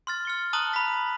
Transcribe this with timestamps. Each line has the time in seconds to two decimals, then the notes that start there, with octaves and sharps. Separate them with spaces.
0.07 C6 F6 A6
0.25 F6 C#7 G7
0.53 A5 A#5 D#6 F#6 F#7 G7
0.73 B5 B6